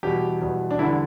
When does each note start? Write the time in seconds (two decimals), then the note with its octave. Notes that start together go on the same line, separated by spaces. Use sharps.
0.03 E2 B2 G3 G4
0.42 E2 B2 G3
0.71 D4
0.79 E2 D3 G3 E4